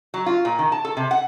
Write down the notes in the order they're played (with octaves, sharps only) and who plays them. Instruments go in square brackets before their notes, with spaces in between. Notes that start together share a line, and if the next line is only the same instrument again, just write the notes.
[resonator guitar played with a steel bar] F#3
F4
A#2
D#3
A5
A4
C3
F#5